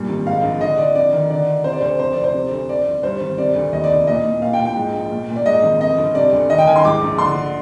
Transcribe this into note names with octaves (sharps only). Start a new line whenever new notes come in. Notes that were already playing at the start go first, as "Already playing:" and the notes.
Already playing: G2 A#2
G#1
G#2 F5
A#1
D3 D#5
D3 D5
F2 D5
D#3
D3 D5
D3
C3 C5
D5
D2 C5
F2 C5
F1 D5
C5
C3
D2
F2 D5
G1
G2 C5
G#1
C3 D5
D2
D#2 D#5
D5
F1
A#2 D#5
A#2
A#2 F5
G5
A#2
G5
G#2
A#1
A#2
A#2
D5
G#2 D#5
G#1
F2 D#5
G1
C3 D5
D2
D#3 D#5
G5
D#3 G#5
C6
G#2 D6
A#1
D3 C6
D3